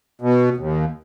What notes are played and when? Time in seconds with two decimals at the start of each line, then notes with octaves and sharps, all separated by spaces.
0.21 B2
0.57 D#2